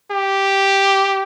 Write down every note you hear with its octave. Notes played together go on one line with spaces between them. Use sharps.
G4